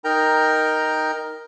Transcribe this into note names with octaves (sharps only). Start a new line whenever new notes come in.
D#4 A#4 G5 A#5